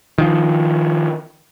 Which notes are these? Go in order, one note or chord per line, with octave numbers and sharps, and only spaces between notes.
D#3 F3